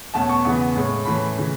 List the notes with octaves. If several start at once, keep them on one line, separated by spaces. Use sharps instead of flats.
E2 B2 A3 C#4 A5
C#6
E2 C#3 E3 B3
A2 G#3 C#4
A2 E3 A3 C#4 B5
C#3 E3